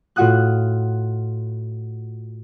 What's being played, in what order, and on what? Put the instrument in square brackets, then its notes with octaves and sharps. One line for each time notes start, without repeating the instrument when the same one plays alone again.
[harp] A2 F4 F#4 F#5 D#6 F#6